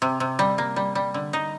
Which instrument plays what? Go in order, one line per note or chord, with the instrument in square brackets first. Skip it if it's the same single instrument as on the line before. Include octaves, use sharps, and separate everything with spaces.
[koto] C3
C3
G3
A#3
G3
G3
D3
D#4